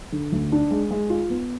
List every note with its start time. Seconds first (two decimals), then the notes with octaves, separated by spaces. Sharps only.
0.12 D3
0.32 D2
0.52 D4
0.71 G#3
0.91 G#3
1.10 F4
1.30 B3